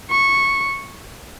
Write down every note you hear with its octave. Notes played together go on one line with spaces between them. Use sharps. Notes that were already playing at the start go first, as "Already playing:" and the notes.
C#6